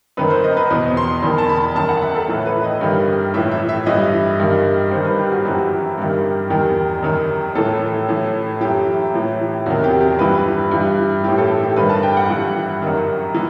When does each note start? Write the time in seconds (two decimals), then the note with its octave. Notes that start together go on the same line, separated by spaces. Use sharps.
0.17 F#2 D#3 B4
0.30 C5
0.44 D#5
0.57 B4
0.70 E2 B2 D#5
0.97 C6
1.22 E2 D#3 B5
1.38 A5
1.49 B5
1.75 F#2 D#3 A5
1.88 F#5
2.02 E5
2.15 A4
2.28 A2 E3
2.46 B4
2.64 D#5
2.81 G2 D#3
3.34 A2 E3 E5
3.51 E5
3.69 E5
3.86 G2 E3 D#5
4.40 G2 D#3
4.91 G2 D#3 C5
5.05 B4
5.18 G4
5.32 F#4
5.45 F#2 E3 G4
5.98 G2 D#3
6.50 E2 D#3 G4
7.03 F#2 D#3
7.55 A2 E3 A4
8.08 A2 E3
8.61 F#2 E3 G4
9.14 A2 E3
9.66 E2 C3 D#3 F#4
9.84 G4
10.01 G4
10.19 G2 E3 B4
10.71 G2 E3
11.24 A2 E3 G4
11.38 A4
11.63 G4
11.76 G2 D#3 B4
11.90 A5
12.03 G5
12.17 F#5
12.29 G2 E3
12.82 F#2 D#3
13.34 E3